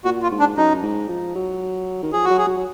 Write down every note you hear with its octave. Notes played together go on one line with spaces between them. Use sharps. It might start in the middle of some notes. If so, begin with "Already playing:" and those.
A#2 F#4
F4
G#2
D4
F#2 D#4
G#2
F3
F#3
D#3
F3 G#4
F#4
F#3
G#4
F#3
F#3